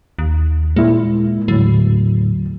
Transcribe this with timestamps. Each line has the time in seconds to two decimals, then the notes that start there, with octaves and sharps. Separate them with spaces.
0.19 D#2
0.76 A#2 G#3 A#3 E4
1.48 D#2 A2 D3 F#3